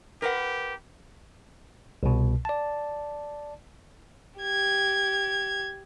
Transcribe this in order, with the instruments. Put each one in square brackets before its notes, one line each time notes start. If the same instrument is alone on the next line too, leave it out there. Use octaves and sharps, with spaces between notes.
[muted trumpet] G4 [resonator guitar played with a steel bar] A#4 B4 F#5
[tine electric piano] C2 B2
D5 A5
[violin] G4 G#6